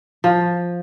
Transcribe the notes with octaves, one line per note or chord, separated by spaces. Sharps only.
F3